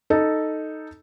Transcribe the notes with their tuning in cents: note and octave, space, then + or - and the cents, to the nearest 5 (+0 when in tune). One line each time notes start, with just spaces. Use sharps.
D#4 +0 A4 +0